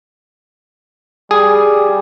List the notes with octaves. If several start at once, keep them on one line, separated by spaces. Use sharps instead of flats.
G3 G#4